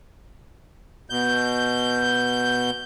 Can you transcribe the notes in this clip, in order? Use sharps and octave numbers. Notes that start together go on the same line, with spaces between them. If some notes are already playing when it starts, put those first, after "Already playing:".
B2 G6